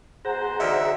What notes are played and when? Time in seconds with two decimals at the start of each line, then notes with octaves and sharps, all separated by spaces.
0.25 B2 G#4 C5 F#5 A#5
0.60 D2 D3 D#3 E5